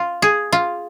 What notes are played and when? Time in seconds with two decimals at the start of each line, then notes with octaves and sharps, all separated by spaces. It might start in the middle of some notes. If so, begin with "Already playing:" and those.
Already playing: F4
0.22 G#4
0.52 F4